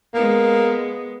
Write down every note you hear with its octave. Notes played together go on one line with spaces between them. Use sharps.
G#3 A#3 B3